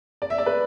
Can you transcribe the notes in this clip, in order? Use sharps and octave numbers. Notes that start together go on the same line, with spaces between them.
D5
E5
D5
B4